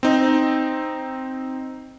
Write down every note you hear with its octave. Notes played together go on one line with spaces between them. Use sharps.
C4 D#4